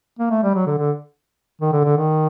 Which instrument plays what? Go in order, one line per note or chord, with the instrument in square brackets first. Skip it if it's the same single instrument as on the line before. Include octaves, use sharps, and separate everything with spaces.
[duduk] A#3
A3
G3
F#3
D3
D3
D#3
D3
D3
D#3